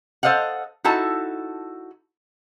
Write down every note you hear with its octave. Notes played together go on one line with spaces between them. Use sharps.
A4 C5 D#5 F5 F#5
D#4 E4 F#4 A4 A5